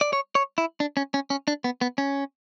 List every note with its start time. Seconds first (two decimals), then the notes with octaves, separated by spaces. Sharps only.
0.01 D5
0.13 C#5
0.35 C#5
0.58 E4
0.80 D4
0.97 C#4
1.14 C#4
1.30 C#4
1.48 D4
1.64 B3
1.81 B3
1.98 C#4